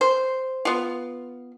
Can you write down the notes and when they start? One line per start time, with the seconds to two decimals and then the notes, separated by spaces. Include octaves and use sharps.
0.01 C5
0.65 B3 F4